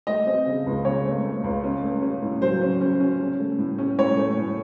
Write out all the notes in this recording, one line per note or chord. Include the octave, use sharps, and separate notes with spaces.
A3 D#5
C4
C#3
C#2
C#3 C#5
A3
A3
C#2
C#4
A3
C#4
A2
F#3 C5
C#4
C#4
C#4
C#4
A3
A2
C#4
A2 C#5
A3
A2